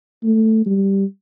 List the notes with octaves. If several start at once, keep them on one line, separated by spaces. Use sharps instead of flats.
A3
G3